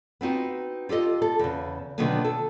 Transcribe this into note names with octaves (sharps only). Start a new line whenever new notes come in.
B3 C4 D#4 F#4
F4 G4 A4 D#5
A4
E2 C#3
B2 D3 D#3 F#3 A#3 B3
A4